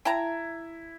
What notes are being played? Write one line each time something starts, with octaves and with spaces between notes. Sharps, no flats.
E4 G5 A5 A#5